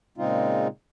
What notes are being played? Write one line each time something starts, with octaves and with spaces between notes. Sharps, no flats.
A#2 C#3 G#3 C4 D#4 F4